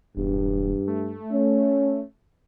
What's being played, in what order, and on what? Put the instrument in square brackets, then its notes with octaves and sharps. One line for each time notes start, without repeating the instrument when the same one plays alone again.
[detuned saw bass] E1 [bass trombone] G2
[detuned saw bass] A3
[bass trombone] C#4